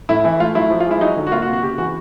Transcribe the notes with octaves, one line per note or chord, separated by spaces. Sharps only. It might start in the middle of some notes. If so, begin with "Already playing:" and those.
A2 E4
E3 E4
A3 F4
F#3 E4
F3
F4
G#3
E4
F#3 D#4
D3
F#4
A#3 F4
F#4
C3
F#4
C#3 G4
E3 F#4